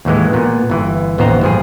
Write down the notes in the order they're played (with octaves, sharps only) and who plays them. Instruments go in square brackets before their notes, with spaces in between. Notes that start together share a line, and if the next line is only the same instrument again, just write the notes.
[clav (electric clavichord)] D#2 A2 E3 G#3
A#2 B3
G1 E3
A1 D#2 B3 D#4 C5 A#5
G1 F3 G#4